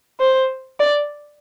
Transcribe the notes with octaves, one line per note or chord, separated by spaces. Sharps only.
C5
D5